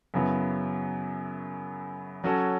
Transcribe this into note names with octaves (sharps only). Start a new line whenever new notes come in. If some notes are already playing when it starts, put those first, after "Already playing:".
F#2 C#3 F#3 B3 E4
F#3 C#4 F#4 A4 C#5